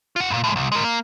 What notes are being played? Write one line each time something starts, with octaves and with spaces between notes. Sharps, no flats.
F4 F#5
E2 A#2
A2 G#3
C2
G#3 A#4
A#3